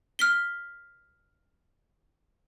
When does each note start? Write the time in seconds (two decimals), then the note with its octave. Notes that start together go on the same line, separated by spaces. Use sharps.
0.19 F6 B6 G7